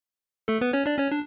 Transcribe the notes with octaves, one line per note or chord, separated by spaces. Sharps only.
A3 A4
B3 B4
C#4 C#5
D4 D5
C#4 C#5
D4